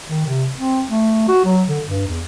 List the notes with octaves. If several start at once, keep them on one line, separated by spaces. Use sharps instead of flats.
D#3
C3
C4
A3
F#4
F#3
D3
G2
E2